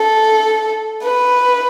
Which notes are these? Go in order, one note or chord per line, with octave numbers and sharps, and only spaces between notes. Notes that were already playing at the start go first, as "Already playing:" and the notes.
Already playing: A4
B4